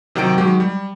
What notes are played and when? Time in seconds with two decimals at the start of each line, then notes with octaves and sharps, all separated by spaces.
0.15 C3 D#3 F#3 D#4 G5 D7
0.38 D#3 F#3 G#3 G4
0.60 G3